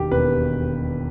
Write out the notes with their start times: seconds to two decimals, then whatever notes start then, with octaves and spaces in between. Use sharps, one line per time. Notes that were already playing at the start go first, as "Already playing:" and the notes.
Already playing: E1 D#2 D#3 G4
0.12 E1 D#2 D#3 B4